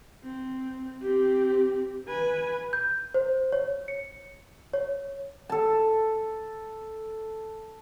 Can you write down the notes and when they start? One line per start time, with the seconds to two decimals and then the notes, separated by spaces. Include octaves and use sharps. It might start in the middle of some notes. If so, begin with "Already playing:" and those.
0.24 C4
1.02 C4 G4
2.07 B4 G#5
2.73 G6
3.14 C5
3.53 C#5
3.88 C#7
4.74 C#5
5.49 A4 A5